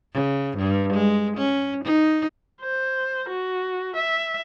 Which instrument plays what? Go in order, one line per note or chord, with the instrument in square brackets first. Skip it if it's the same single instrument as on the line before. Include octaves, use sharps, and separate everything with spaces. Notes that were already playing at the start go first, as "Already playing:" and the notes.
[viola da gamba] C#3
G2
G#3
C#4
D#4
[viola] C5
F#4
E5